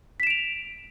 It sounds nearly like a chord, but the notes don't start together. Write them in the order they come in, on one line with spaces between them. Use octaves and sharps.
B6 E7 D7 F7